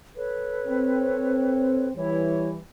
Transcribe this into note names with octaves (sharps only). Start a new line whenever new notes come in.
A4 B4 C#5
C4
E3 G3 E4 C#5